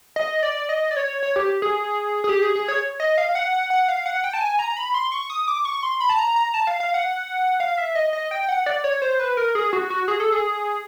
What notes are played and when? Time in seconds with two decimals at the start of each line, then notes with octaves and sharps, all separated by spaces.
0.16 D#5
0.43 D5
0.69 D#5
0.91 D5
0.96 C#5
1.23 C#5
1.36 G4
1.62 G#4
2.24 G#4
2.29 G4
2.42 G#4
2.55 G#4
2.68 C#5
3.00 D#5
3.18 F5
3.35 F#5
3.53 F#5
3.70 F#5
3.88 F5
4.06 F#5
4.24 G5
4.33 A5
4.41 G#5
4.59 A#5
4.77 B5
4.94 C6
5.12 C#6
5.30 D#6
5.48 D6
5.65 C#6
5.83 C6
6.00 B5
6.09 A5
6.18 A#5
6.36 A#5
6.54 A5
6.67 F5
6.80 F5
6.94 F#5
7.60 F5
7.78 E5
7.95 D#5
8.13 D#5
8.31 G5
8.49 F#5
8.66 D5
8.84 C#5
9.02 C5
9.19 B4
9.37 A#4
9.55 G#4
9.73 F#4
9.90 F#4
10.08 G#4
10.20 A4
10.32 G#4